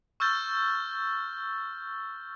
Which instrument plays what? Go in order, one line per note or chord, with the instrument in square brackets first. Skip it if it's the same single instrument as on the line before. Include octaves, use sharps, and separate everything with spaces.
[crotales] C#6 E6 F6 G6 A6 G7